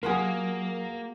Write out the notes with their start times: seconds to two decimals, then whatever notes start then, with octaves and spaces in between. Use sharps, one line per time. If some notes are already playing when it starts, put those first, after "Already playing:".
0.03 F#3 A#3 F4 F#4 G#4 A#4